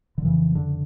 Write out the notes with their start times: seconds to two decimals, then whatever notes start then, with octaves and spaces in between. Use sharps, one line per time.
0.18 D3
0.24 F2 C#3 E3
0.55 D3